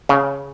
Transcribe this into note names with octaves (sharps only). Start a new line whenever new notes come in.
C#3